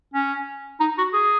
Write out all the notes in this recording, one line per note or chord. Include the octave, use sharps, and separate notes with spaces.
C#4
D#4
F#4
G#4